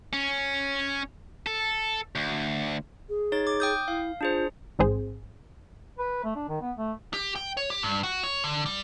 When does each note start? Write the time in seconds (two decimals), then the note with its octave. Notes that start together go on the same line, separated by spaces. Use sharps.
0.13 C#4
1.46 A4
2.15 D2
3.09 G#4
3.32 D#4 C#5 A6
3.47 D6
3.60 G5 D#6 G6
3.88 E4 F5
4.21 D4 F4 G#4 C5
4.79 A1 G#2 C4 G#4 C5
5.99 B4
6.24 A3
6.36 D4
6.48 D#3
6.61 B3
6.77 A3
7.14 G4
7.36 G5
7.57 C#5
7.70 G4
7.83 G2
8.03 F#4
8.24 C#5
8.44 D3
8.66 G3